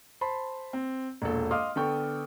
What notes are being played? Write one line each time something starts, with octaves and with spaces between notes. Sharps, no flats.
C5 A5 B5 C6
C4
E1 A#1 A#2 A4
D#5 F5 C6 D6 D#6 F6
D3 B3 A4 G5 C#6